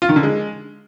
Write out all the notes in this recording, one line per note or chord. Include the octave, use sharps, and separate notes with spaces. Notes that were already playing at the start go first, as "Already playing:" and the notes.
F4
D#3
D3
G#3